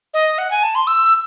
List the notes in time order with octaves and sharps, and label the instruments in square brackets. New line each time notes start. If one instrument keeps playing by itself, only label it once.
[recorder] D#5
F#5
G#5
A5
C6
E6